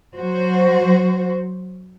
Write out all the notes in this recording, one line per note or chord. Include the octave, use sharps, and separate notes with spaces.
F#3 F#4 C5